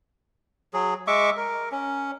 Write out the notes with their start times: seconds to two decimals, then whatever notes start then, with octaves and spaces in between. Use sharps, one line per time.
0.74 F#3 G#4
1.07 G#3 E5 C#6 D6
1.37 A#4
1.72 C#4